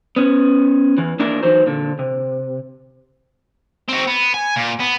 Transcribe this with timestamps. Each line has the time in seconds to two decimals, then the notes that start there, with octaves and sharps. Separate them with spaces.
0.16 B3 C#4
0.98 E2 E3
1.19 A#3 D4 E4 A#4
1.43 E3 F#3 D#4 C5
1.67 A#2 D3
1.99 C3
3.89 C4 F#4
4.07 B3
4.34 G#5
4.56 A#2
4.80 B3